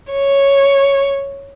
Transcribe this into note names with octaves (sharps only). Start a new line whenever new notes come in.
C#5